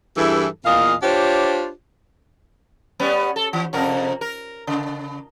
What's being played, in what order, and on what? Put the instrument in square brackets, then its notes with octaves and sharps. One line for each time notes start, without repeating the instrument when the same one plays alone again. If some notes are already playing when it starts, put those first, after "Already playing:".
[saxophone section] G2 E3 E4 G#4 A4
E2 A#2 D#5 F5
D4 F4 G4 C5 C#5
[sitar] G3 B3 C#4
A4
E3
F2 C3 A#4
A#4
C#3